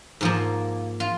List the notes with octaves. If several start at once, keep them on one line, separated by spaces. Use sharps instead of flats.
G#2 F3 A#3
F4